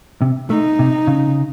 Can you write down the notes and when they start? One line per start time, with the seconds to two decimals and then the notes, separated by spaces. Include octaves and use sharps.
0.22 C3
0.50 A3 D#4
0.79 C3
1.07 C#3